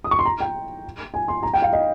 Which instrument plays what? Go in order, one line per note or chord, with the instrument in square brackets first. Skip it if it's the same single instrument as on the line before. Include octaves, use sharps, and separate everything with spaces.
[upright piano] D#6
C#6
C6
A#5
G5
G#5
C6
A#5
G5
F5
D#5